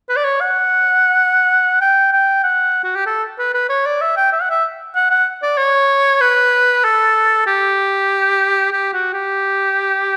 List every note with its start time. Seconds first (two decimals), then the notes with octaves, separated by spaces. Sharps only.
0.09 B4
0.16 D5
0.24 C#5
0.41 F#5
1.81 G5
2.13 G5
2.43 F#5
2.84 F#4
2.95 G4
3.06 A4
3.39 B4
3.54 B4
3.69 C#5
3.86 D5
4.01 E5
4.17 G5
4.32 E5
4.42 F#5
4.50 E5
4.95 F#5
5.10 F#5
5.42 D5
5.57 C#5
6.21 B4
6.84 A4
7.47 G4
8.72 G4
8.93 F#4
9.13 G4